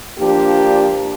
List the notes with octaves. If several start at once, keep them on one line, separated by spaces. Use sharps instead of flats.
F3 A#3 D4 G4